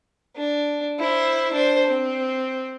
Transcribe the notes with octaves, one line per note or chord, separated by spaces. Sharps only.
D4
E4 C5
D4 C5
C4